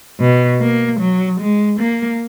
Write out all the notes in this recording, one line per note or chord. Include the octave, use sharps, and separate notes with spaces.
B2
A#3
F#3
G#3
A#3